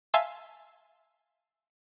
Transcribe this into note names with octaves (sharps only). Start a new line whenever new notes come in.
E5 F5 G#5 A5 C6 E6